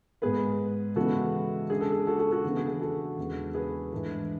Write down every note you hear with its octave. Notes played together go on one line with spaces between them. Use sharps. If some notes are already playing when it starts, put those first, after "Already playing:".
G#2 G#3 B3 G#4 B4
C#3 E3 G#3 B3 F#4 A4
C#3 G#3 D4 G#4
A4
G#4
F#4 A4
F#4 A4
F#4 A4
C#3 E3 B3 D4
G#4
G#4
F#4 A4
E2 C#3 G#3 B3 D4
G#4 B4
G#2 E3 A3 D4